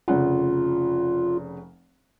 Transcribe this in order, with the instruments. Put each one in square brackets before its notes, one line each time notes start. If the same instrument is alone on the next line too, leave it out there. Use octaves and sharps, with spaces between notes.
[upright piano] F1 C#3 F#5 [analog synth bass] F4